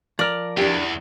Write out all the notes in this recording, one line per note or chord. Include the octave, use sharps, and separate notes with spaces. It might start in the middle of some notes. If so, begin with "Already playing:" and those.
F3 A#4 D5 A#5
E2 D4 G4